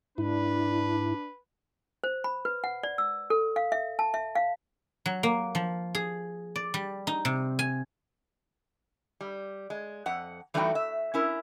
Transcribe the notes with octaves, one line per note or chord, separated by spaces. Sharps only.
G#2 D4 E4 B4
C5
B5
B4
F#5
D5
E6
A4
F5
E5
A5
E5
F5
F#3
A#3
F3
G#4
D5
G3
D#4
C3
G#5
G3
G#3
F2 F#5
E3 G3 A3 D#4 F#4 G5
E5
C#4 E4 A#4